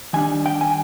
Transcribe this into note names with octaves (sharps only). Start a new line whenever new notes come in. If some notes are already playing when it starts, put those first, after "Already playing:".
D#3 G3 D4 G#5
G5
G#5